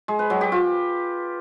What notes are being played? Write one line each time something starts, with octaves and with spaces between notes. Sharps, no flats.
G#3
B4
F#3
G4
F4